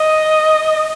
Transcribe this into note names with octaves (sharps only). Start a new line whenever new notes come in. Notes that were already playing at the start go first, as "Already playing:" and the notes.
Already playing: D#5